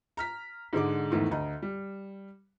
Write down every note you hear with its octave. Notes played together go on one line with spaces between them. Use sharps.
A#5 F6 B6
G#2 D3 G#3 D6
E2 G#2 D#3 A3
D2 D#5 A#5
G3